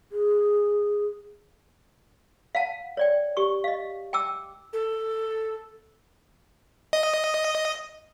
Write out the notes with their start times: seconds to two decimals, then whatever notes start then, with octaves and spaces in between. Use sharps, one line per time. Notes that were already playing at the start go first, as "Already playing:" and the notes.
0.12 G#4
2.55 F5 F#5 A5
2.97 C#5 D5 G5
3.37 G4 C#6
3.64 D#5 F5
4.13 G5 A5 D6 E6
4.72 A4
6.93 D#5